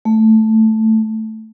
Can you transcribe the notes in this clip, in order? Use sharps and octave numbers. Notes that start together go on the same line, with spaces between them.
A3